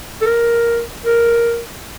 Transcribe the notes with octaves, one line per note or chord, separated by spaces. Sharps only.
A4
A#4
A#4